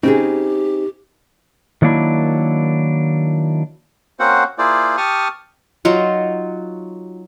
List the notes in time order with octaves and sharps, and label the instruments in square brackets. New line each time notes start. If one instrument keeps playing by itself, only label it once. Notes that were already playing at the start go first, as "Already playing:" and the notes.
[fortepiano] C#3 [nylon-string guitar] C4 G#4 [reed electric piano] D#4 [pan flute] G4
[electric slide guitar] D#3 F#3 A#3 D4 E4
[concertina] A#3 C4 C#4 F#4 C5 F#5
A#3 E4 F4 G#4 C5 D5
G4 A5 C#6 D#6 F6
[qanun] F#3 F4 F#4 [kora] D#4